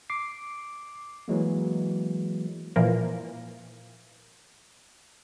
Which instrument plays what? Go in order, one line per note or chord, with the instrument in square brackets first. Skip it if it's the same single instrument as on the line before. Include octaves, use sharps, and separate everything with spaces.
[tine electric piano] D6 C7
E3 F#3 G#3 A#3
[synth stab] A#2 E3 F3 A#3